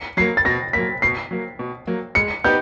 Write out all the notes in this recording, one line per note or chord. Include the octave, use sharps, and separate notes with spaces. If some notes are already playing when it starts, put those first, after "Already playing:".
Already playing: C#7
F#3 A#3 C7
A6
B2 A#6
F#3 A#3 B6
B2 C7
F#3 A#3
B2
F#3 A#3
G#3 C#7
B3 D#4 G4 B4 G6